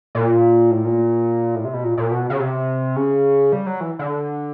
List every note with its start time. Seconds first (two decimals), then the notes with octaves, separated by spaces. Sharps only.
0.15 A#2
0.71 A2
0.85 A#2
1.55 A2
1.65 C3
1.74 B2
1.84 A#2
1.97 A#2
2.11 B2
2.30 C#3
2.40 C3
2.96 C#3
3.53 G3
3.66 F#3
3.80 E3
3.99 D3